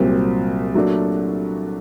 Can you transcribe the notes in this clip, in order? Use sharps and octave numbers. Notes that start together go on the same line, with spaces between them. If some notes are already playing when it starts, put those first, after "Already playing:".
Already playing: C2 A#2 F#3 C4
A#2 F#3 A3 D4 F#4